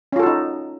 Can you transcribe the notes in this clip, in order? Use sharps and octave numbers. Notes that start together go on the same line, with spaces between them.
C#4 D#4 F4 F#4 A4